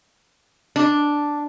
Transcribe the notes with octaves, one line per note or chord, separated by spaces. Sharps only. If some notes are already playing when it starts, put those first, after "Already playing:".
D4